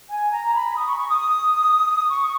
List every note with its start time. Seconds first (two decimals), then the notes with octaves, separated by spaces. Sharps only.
0.09 G#5
0.32 A#5
0.54 B5
0.76 D#6
0.87 C#6
0.98 C#6
1.09 D#6
2.09 C#6